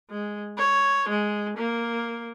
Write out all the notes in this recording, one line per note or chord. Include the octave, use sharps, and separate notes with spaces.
G#3
C#5
G#3
A#3